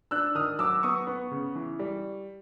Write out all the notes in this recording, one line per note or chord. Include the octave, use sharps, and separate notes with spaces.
D4 E6 F#6
D#3 D#6 F6
F#3 D6 E6
B3 C#6 D#6
B3
C#3
E3
G3